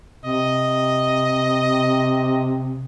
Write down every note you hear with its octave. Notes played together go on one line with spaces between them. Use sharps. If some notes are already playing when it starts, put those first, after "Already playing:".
C3 D#5